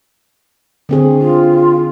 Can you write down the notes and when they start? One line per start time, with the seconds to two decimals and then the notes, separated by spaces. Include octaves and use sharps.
0.89 D3 C4 G#4
1.19 F4